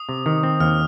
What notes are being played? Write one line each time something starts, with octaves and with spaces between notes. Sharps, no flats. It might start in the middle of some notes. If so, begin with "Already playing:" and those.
Already playing: D#6
C3
D#3
C4
D#2 F6